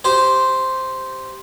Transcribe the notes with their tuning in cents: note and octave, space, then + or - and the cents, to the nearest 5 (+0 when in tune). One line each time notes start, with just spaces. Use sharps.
G4 -10 C5 +0